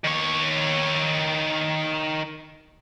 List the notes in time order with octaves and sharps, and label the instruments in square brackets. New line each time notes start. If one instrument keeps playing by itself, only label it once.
[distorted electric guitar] D#3 C#5